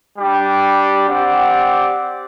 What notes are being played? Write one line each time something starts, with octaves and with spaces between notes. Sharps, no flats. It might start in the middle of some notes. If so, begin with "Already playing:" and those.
G3 D4 G4
C4 G4 D5 F#5